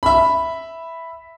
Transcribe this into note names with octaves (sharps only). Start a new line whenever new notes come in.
E5 B5